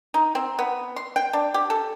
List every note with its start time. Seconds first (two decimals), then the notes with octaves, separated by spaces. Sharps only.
0.14 D#4
0.35 C4
0.59 B3
0.96 C6
1.16 G5
1.33 D4
1.54 G4
1.70 A4